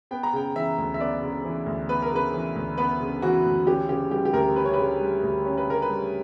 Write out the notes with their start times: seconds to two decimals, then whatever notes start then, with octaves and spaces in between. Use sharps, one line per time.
0.11 B3 G5
0.23 A#5
0.33 C#3 G5
0.55 E3 E5
0.78 D2
0.94 E5
1.00 B3 D5
1.22 C#3
1.45 E3
1.66 D2
1.89 B3 B4
2.02 A#4
2.12 C#3 B4
2.34 E3
2.56 D2
2.78 B3 B4
3.00 C#3
3.22 E3 F#4
3.45 D2
3.67 C#4 G4
3.89 C#3 G4
4.11 G3 G4
4.25 G4
4.33 D2 A#4
4.56 C#4 B4
4.65 C#5
4.73 C#3 B4
5.00 G3
5.23 D2
5.45 C#4 C#5
5.57 B4
5.67 C#3 A#4
5.82 B4
5.89 G3